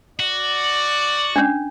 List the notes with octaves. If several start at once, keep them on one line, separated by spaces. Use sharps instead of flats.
F#4 D5
C#4 D4